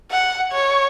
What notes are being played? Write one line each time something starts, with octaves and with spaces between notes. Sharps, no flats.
F#5
C#5